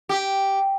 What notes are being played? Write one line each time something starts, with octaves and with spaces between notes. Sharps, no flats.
G4